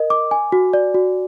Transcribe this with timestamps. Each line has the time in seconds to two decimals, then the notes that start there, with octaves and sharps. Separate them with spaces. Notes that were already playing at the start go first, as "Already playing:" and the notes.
Already playing: A#4 D#5
0.10 D6
0.31 G#5
0.52 F#4
0.73 D5
0.94 F#4